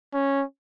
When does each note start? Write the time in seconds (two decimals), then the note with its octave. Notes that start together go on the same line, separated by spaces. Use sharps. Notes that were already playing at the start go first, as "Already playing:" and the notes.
0.14 C#4